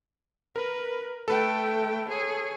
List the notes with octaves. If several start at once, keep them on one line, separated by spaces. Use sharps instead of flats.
A#4 B4
A3 A4 B4 G5
G#4 C#5